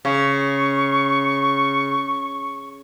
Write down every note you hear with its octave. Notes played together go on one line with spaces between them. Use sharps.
C#3 C#6